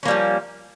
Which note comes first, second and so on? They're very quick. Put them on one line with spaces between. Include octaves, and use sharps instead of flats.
C#4 A#3 G3 F3